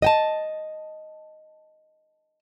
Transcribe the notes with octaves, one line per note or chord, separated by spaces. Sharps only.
D#5 G5 A5